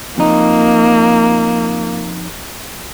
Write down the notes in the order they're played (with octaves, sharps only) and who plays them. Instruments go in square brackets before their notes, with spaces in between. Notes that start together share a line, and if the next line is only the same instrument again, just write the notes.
[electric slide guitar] F2 D#4 [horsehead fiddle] A#3